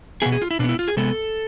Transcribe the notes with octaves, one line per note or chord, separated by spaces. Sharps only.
B2 B3 G#4
G#4
F4
E4
B2 B3 D4 E4
F4
G#4
C3 G#3 B3 A4